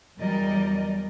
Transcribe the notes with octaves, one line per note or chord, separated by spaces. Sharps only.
E2 F#3 G3 A#4 D5 D#5